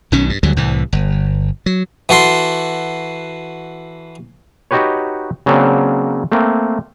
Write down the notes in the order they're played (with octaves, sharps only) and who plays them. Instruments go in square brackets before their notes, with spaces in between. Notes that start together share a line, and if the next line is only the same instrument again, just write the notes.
[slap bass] B1 B2 D#3 C#4
G2
D2 D3 F#3 G3
C2 A2 E3
G1
F#3
[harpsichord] E3 F#4 A4 C6
[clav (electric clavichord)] D#4 F#4 G4 B4 C#5
C#3 F#3 A#3 C4 D4 F#5
A3 A#3 C4